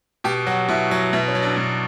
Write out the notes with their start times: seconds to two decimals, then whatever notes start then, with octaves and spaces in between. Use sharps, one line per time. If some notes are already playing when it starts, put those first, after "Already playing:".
0.24 B2 G4
0.47 F#3 F#4
0.68 B2 E4
0.91 F#3
1.13 B2 E4
1.28 C#4
1.35 F#3
1.43 D4
1.57 B2